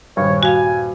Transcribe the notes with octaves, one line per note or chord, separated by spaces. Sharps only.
D#1 G2 C#5
F#4 F5 G#5